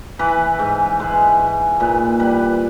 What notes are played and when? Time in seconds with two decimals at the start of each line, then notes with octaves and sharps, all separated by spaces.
0.19 E3 B4
0.59 G#2
0.99 G#3 B4
1.39 G#2
1.80 A#2 B4
2.20 G3 B4